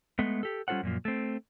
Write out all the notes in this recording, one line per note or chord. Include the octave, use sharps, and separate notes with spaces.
G#3 A3 B3
G4 A4
G3 C#4 F4 A4 C5 F#5
F#2 A#2 F3
A3 C4